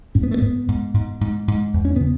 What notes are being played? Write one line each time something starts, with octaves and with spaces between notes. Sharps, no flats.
G#2 C#4
B3
A3
G#2 B3
G#2
G#2
G#2
G#2
E2
C#4
C#3 B3